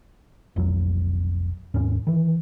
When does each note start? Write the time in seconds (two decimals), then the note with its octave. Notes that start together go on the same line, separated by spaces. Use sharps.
0.56 F1 B1 F2 F#3
1.74 D#2 G#2 C#4
2.07 D#3 E3